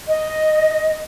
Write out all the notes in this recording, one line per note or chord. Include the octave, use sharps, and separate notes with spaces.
D#5